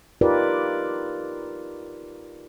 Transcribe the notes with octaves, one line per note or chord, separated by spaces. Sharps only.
D#4 F4 G4 A#4 B4 D5